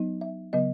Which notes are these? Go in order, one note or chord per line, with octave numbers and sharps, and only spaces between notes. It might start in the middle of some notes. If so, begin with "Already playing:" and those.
Already playing: F#3 B3 D#4
E5
C#3 F#3 B3 D#5